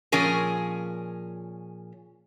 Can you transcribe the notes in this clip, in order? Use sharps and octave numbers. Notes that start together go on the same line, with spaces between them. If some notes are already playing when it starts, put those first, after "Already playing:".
A#2 F3 C#4 G#4 A#4